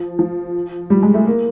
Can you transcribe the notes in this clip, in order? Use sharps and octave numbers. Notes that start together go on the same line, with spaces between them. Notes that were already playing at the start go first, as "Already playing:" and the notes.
Already playing: F3
F3
G3
G#3
A3
A#3